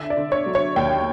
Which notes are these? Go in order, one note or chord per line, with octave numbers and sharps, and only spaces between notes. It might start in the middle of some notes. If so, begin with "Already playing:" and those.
Already playing: D3 E5
D5
D3
C#5
F#3
C#5
D#2 G5